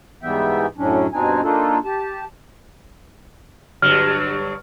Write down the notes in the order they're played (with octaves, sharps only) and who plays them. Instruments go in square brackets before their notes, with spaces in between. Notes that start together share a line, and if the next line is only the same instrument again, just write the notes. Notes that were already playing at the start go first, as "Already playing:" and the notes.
[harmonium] G#2 E3 G3 B3 E5 G5
F#2 A2 F#3 C#4 D4
G2 B2 C4 D4 D#4 G#5
A#3 D4 D#4 F4 A4
G4 A5
[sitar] G2 D3 F#3 [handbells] F6